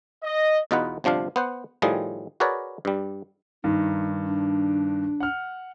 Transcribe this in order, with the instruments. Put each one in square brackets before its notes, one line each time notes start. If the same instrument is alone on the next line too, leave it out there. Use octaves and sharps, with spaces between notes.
[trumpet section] D#5
[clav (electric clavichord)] E2 B2 D#4 F4 B4 F#5
G1 C3 F3 D4 F5
B3 C5 F#5
A2 D#3 F3 G3 G#4
F#4 G#4 A#4 B4 C#5 D5
G2 G3
[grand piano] G2 D#3 [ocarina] D#4
[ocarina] D4
[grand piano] F#5 F6